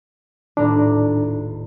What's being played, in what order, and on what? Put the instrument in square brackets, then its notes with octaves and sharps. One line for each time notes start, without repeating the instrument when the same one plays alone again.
[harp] D#1 A2 A#5 [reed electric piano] D4